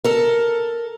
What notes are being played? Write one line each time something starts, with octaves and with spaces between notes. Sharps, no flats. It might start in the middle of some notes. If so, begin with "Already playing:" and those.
A4 A#4